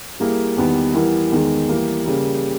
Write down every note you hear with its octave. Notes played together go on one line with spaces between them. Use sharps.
G3 A#3 E4 G#4
E2 D#3 G3 B3
E3 G3 B3 E4 A#4
E2 D#3 G#3
E3 G3 A#3
C#3 G3 A#3